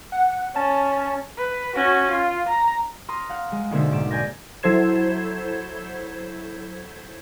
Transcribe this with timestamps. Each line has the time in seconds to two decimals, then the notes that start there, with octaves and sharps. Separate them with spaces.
0.12 F#5
0.56 C#4 A5
1.37 B4
1.75 C#4 F#4
2.11 F4
2.48 A#5
3.08 A#5 C6 D#6 F6
3.29 F5 F#5
3.52 G#3
3.71 B1 D3 A#3 G#4 C5 E5
3.92 G#2 D6 E7
4.11 D5 G#5 G6 A#6
4.63 F#3 E4 A4 C5 G#6 E7